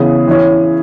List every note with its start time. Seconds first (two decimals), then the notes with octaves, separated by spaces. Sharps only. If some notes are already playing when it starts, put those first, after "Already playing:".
Already playing: C#3 E3 B3 G#4
0.28 E3 C#4